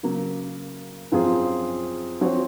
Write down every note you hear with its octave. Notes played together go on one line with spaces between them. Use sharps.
C#3 F#3 A#3
F#2 F3 C4 F4 G#4
F3 C4 F#4 C#5